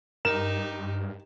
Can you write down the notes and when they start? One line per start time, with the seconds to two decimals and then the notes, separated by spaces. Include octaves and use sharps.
0.25 G2 D#4 G4 A#4 E7